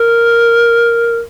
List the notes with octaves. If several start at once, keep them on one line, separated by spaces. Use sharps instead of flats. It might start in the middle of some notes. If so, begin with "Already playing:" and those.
Already playing: A#4